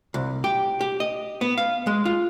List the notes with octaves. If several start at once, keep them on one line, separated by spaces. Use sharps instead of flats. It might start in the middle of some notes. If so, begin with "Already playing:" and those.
C2
G4
G4
D#5
B3
F5
G#3
F4